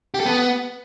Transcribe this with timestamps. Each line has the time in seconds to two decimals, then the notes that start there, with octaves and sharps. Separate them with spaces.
0.14 G4
0.20 A4
0.26 B3